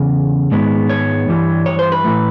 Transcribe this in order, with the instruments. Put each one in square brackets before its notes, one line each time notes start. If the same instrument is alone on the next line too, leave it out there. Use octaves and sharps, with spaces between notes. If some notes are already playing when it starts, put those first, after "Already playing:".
Already playing: [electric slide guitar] E2 C#3
G#2 D#3 G#3 B3
C#5
G2 E3 G3
C#5
C5
B4
A2 E3 A3